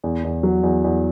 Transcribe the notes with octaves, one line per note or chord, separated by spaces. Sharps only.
E2
E2
F#3
E2
E2